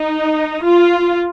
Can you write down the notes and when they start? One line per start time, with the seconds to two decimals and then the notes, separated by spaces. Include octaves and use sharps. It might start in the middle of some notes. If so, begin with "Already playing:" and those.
Already playing: D#4
0.62 F4